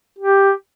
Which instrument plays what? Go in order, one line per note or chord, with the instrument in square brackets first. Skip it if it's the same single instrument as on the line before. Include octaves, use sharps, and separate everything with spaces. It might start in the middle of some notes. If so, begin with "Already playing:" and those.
[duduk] G4